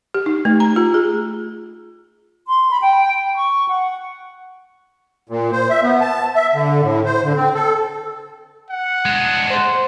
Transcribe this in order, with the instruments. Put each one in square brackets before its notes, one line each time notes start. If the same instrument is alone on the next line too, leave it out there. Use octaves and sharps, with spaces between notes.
[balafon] G4
D#4
A3
A#5
F4
G#4
[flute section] C6
B5
G5
C#6
F#5
[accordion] A#2
C5
E5
B3
A5
E5
D3
A2
C5
D3
C4
A4
[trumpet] F#5
[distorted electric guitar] G#3 D4
[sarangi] C5